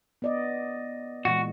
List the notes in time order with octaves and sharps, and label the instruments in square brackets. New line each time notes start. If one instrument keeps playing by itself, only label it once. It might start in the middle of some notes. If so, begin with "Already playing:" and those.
[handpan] B3 D5 D#5
[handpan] A#2 E3 G#3 [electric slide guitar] F#4